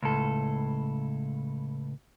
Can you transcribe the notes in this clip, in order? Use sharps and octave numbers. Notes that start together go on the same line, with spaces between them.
C#2 A2 A4